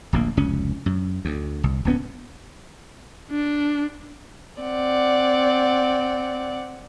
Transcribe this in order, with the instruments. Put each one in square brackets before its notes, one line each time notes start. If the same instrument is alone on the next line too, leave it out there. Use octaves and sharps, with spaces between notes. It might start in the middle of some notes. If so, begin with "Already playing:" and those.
[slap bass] D1 A#1 A#3
F1 C#2 C#4
F#2
D2
C2
D1 F2 B3 C#4
[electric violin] D4
[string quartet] C4 D5 F#5